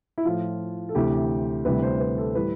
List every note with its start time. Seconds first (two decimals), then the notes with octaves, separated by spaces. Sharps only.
0.18 E4
0.25 A2 F3 F4
0.89 A4
0.95 D2 C3 E3 G4
1.65 D2 C3 E3 G3 B4
1.82 C5
2.00 B4
2.18 A4
2.35 A2 E3 G3 B4